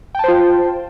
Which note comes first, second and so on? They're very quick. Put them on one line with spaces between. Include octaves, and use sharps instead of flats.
G5 A5 C5 F4